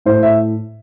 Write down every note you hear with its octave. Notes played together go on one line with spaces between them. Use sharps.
A2 C5
E5